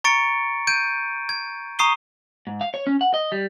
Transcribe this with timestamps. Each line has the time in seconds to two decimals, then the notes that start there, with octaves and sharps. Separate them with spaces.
0.04 A#5 C#6 A6 C#7 D7
0.67 G6 G#6 D7 D#7
1.29 G#6
1.79 A#5 C#6 D#6 C7 D#7 G7
2.47 G#2
2.61 F5
2.74 C#5
2.87 C#4
3.01 F#5
3.14 D#5
3.32 G3